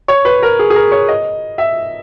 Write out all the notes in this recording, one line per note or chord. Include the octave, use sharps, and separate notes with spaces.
C#5
B4
A#4
G#4
G#4
A#4
C#5
D#5
E5